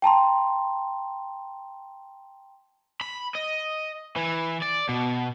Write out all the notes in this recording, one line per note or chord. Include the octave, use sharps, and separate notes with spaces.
G5 A5 A#5 C6
B5
D#5
E3
D5
B2